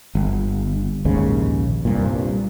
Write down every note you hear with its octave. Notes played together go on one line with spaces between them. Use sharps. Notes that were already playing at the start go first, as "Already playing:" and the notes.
G1
A#1 D#2 G#2 C#3
C2 G2 A#2